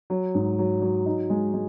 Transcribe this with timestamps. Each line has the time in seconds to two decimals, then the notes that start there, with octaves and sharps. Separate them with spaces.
0.10 F#3
0.35 G#2
0.59 F#3
0.82 F#3
1.06 D#4
1.30 G#3
1.54 G#3